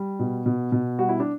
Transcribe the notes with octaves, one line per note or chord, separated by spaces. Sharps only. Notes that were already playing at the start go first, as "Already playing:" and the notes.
Already playing: G3
B2
B2
B2
G3 F#4
E4
D4